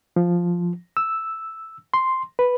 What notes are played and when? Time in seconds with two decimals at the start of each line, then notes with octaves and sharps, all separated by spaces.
0.16 F3
0.97 E6
1.94 C6
2.39 B4